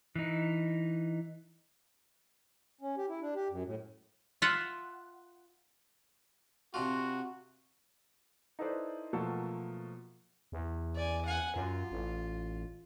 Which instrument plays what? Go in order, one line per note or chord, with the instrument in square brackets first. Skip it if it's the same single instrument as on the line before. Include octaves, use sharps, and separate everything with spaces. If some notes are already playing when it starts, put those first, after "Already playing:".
[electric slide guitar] E3 D#4
[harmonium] C#4
G4
E4
D4
G4
F#2
A2
[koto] F4 E5 F#5
[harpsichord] C3 D4 F4 [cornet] F#4
[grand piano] D#4 E4 A4 B4 C5 D5
B2 F3 F#3 A3 A#3 A4
[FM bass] E2
[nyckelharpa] D5 G#5
F#5 G#5
[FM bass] F#2 [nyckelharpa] F4
[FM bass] A1